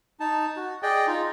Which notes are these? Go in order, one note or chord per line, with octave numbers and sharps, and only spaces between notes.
D#4 A5
F#4
G#4 D5 D#5 G5
D#4 F4